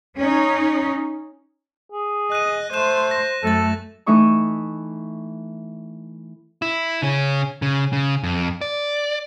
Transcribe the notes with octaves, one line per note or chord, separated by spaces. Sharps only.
C#4 D#4
G#4
D#5 F#6 D#7
A3 C5 F#6 E7
A#6
F#2 A3 A4 F#6 A6
E3 A3 D#4 E5 C#6 D#6
E4
C#3 C#4
C#3
C#3
F2
D5